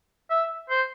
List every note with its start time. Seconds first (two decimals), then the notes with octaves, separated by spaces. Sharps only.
0.30 E5
0.70 C5